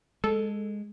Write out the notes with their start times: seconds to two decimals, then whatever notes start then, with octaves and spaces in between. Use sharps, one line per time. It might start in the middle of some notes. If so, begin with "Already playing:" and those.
0.24 G#3 A4